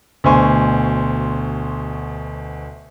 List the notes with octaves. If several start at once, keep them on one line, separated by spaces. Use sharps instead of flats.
D2 B2 C5 G#5 C6 C#6